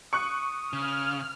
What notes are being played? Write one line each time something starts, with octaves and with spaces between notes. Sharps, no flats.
C#6 D#6 F#6
C#3 F6